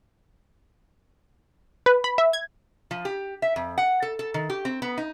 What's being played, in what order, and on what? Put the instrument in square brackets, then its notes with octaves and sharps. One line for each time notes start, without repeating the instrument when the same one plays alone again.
[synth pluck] B4
B5
E5
G#6
[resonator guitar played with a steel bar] F3
G4
E5
F2
F#5
A4
A4
D#3
G4
C4
B3
D#4